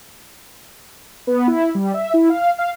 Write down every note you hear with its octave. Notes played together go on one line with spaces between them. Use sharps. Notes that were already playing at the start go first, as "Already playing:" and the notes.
B3
E4
G3
E5
E4
F5
F5